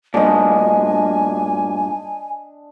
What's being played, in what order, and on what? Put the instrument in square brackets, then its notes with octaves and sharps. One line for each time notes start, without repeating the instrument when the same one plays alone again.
[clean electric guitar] G2 A#2 [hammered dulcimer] D4 D#5 [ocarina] G#5